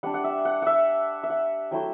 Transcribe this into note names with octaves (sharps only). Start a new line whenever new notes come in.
G3 D4 F#5
F#5
E5
F#5
E5 F#5
E5
F#5
F#3 A3 E4 G5